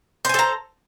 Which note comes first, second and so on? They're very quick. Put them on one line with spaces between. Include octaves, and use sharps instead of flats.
C5 G#5 A4 A#5